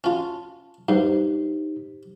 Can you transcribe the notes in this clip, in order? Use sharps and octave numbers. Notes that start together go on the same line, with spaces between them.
C#4 F4 A5
G2 D#4 G4 C5